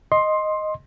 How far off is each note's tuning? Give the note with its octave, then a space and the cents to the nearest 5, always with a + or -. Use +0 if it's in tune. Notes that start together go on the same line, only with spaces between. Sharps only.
D#5 +0 C6 +15